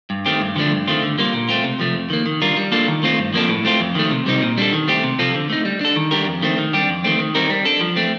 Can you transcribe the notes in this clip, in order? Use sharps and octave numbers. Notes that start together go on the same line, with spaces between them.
G2
D#3 A3 C4 G4
G2
D3 F3 A3 D4
G2
D#3 A3 C4 F4
D3
G3 A#3 F4
A#2
A3 C4 F4
C3
F3 A3
F2
D#3 A#3
D#3
G3 D4 F4 A#4
G3
A#3 D4 F4 A4
D#3
A3 C4 F4
G2
F3 A#3 D4 A4
A2
A3 C4 F4
F2
D#3 A3
C3
G3 C4 D#4
A#2
G3 D4 A4
D#3
A3 C4 G4
C3
F3 C4 F4 A4
D3
A3 D#4
G3
D4 A4
D#3
G3 D4 G4 A#4
F2
D#3 A3 C4
D#3
G3 D4 G4
F2
D#3 A3 C4
D#3
G3 C4 D#4 A#4
G3
D4 A4
F3
A3 C4